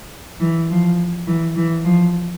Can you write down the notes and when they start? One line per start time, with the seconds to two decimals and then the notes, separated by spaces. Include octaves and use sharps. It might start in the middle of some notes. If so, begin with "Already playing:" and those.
0.40 E3
0.70 F3
1.27 E3
1.56 E3
1.85 F3